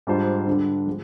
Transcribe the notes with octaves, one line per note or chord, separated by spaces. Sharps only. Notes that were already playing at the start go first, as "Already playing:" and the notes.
G#2 G3 D4 F4 C5
D3 G3 D4
F3 G#3